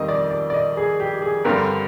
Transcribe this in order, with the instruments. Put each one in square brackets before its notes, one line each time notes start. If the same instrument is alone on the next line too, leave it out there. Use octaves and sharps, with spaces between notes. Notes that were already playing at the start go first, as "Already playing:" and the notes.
Already playing: [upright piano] F2 D#3 G3 C4 D#5
D5
D5
D5
D#5
G#4
G4
G#4
G2 D3 G3 C4 A#4